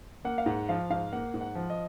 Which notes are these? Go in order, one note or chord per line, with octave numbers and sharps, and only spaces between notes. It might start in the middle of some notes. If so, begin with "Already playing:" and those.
A#3 F#5
F5
G#2 F#5
F3 F5
G#2 F5
A#3 F#5
G#2
F#5
F3
D#5